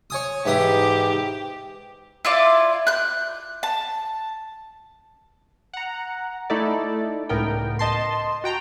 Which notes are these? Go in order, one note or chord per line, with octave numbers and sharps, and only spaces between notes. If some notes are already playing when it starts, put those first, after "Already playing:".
C#5 G#5 D#6
G#2 E3 G4 D#6
E4 F4 D5
F#6 G6
A5
F#5 A#5
A3 D#4 E4 A4 D5
C#2 A2 B3 A#4 G5
D#5 A5 C6
F#4 G5 A#5